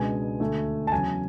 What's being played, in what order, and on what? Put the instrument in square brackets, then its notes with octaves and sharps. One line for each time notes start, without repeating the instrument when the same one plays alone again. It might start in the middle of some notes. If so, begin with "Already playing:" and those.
Already playing: [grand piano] C#2 B2 G#3 B3 D4 G#5
D2 D3 A3
A5
E2 C#3 F#3 G#5